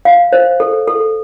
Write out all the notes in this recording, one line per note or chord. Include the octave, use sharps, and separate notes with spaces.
F5
C5
A4
A4